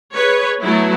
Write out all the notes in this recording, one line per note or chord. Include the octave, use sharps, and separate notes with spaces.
G#4 B4 C#5
F#3 A3 B3 E4